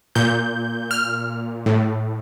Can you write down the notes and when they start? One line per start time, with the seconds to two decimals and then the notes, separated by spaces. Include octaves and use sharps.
0.15 A#2 G6
0.91 F6
1.66 A2